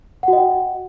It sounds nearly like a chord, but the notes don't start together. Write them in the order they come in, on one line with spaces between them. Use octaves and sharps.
F#5 F#4 D#5 G5